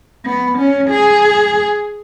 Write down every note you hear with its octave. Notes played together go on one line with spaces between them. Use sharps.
B3
C#4
G#4